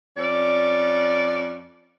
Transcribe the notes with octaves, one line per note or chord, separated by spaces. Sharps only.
F2 C#4 D5